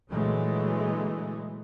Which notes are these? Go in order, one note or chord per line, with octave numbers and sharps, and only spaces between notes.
A#2 D3 E3 F#3 G#3 A3